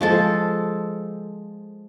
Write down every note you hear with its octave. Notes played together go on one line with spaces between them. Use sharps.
F3 G#3 A4